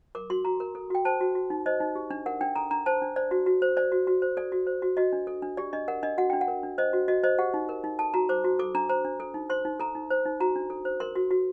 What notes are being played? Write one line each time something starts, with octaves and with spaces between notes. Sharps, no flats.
A#4 D6
F#4 C6
F#4 A#5
A#4
A4
F#4 G5
C5 A5
F#4
F#4
D#4
C5 D#5
D#4
G4
D4
A#4 F#5
D4 G5
A4 A#5
D4 A#5
C5 A5
D4
C5 D5
F#4
F#4
C5
C5 D5
F#4
F#4
C5
A4 D5
F#4
C5
F#4
F#4 D#5
D4
A4
D4
G4 D5
D4 D#5
A#4 F#5
D4 D#5
F#4 F#5
D4 G5
F#5
A#4
D4
C5 D#5
F#4
F#4 D#5
C5 D#5
G4 F#5
D#4
A#4
D#4
A4 A5
F#4 A#5
C5 D6
F#4
A4 D6
D4 A#5
C5 A#5
D4
A4
D#4
C5 C6
D#4
A4 A#5
D#4
C5
D#4
F#4 A#5
D4
A4
C5
A#4 C6
F#4
F#4